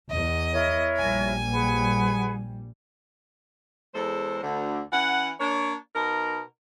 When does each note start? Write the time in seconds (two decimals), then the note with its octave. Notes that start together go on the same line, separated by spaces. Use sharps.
0.10 E2 D#5
0.53 E4 A#4 C#5
0.97 A#1 G3 G#5
1.52 G#4 B4 F#5
3.95 E2 G#3 A4 C5
4.43 D2 D3
4.92 E3 C#4 F#5
5.40 A#3 D4 C#5
5.95 B2 D#4 A#4